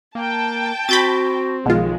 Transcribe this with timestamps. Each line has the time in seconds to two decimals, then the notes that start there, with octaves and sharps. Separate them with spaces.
0.15 A#3 G5 A5
0.89 C4 F#4 B5 G6 A6
1.66 B1 B2 D#3 F3 G#3 F4